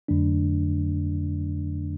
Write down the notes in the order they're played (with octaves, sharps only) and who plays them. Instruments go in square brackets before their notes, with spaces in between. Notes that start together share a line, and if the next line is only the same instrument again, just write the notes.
[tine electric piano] F2 D3 F#3 A3 D4